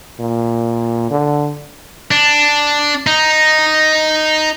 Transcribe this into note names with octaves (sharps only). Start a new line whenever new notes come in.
A#2
D3
D4
D#4